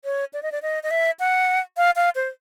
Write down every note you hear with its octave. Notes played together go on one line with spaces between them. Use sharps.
C#5
D5
D#5
D5
D#5
D#5
E5
F#5
F5
F5
C5